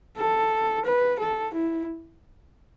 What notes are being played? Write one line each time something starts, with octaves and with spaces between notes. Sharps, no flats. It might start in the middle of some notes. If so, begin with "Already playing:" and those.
A4
B4
A4
E4